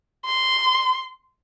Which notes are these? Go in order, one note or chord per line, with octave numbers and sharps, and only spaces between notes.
C6